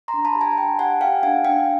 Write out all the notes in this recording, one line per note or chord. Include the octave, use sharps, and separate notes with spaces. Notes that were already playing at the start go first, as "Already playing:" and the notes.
A#5 C6
D4
A5 B5
G4
G#5 A#5
D4 G5 A5
G4 F#5 G#5
G4 F5 G5
D4 F#5 G#5
D4 F5 G5